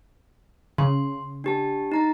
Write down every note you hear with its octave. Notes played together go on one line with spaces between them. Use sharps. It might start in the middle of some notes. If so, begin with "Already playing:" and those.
C#3 C6
D4 G4 A5
D#4 A#5 A6